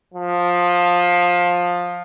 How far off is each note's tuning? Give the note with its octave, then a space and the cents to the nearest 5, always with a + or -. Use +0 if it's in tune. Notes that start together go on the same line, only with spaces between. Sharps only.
F3 +15